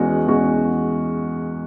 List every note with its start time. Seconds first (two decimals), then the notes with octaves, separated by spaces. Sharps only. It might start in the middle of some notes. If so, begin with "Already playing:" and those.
Already playing: E2 B2 G#3 C#4 F#4
0.27 E2 B2 G#3 C#4 F#4